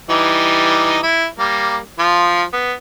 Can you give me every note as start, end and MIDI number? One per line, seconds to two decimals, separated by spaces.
0.09 0.99 52
0.09 0.99 55
0.09 0.99 63
1.03 1.27 64
1.38 1.78 55
1.38 1.78 58
1.99 2.43 53
1.99 2.43 65
2.53 2.73 59